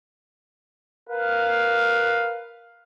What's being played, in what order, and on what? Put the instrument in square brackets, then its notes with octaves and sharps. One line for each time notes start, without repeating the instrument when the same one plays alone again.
[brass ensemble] A#4 B4 F5